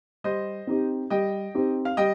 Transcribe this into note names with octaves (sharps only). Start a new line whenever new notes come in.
G3 C5 D#5
C4 D#4 G4
G3 D#5 G5
C4 D#4 G4
F5
G3 D#5 G5